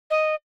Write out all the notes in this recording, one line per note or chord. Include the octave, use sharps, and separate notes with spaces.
D#5